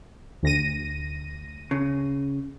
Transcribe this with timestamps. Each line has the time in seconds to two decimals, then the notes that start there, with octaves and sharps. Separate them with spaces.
0.43 D2 A#6 D#7
1.71 C#3